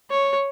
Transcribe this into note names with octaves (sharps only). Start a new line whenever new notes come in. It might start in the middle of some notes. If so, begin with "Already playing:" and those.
C#5